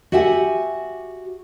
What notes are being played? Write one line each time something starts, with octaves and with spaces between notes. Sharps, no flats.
F#4 G4 E5 F#5 G#5